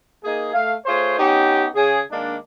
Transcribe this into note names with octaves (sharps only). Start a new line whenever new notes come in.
A#3 D#4 G#4
A3 F5
A3 F4 G#4 C5 C#5
B3 C#4 D#4 G4
C#3 G#4
D#3 G#3 A#3 D4